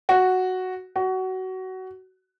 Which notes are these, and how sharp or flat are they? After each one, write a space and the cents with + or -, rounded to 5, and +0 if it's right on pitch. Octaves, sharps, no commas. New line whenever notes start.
F#4 +0
F#4 +20